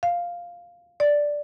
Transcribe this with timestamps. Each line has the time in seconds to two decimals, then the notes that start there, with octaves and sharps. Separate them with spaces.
0.03 F5
1.00 D5